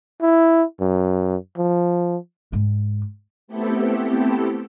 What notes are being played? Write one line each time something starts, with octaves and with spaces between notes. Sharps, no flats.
E4
F#2
F3
G#2 G#3
A3 B3 C4 E4 G4 A4